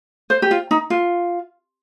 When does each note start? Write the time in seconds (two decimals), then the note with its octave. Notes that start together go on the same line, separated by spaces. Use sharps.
0.30 C5
0.42 G4
0.51 F4
0.71 D#4
0.90 F4